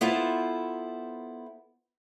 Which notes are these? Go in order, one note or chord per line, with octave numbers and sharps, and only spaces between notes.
B3 E4 F4 A4 C5